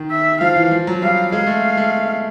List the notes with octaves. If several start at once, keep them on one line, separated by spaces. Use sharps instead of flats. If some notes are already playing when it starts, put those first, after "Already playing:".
Already playing: D#3
E5
F3 F5
E3
F3
F#3
G3 F5
G#3 F5
A3
A3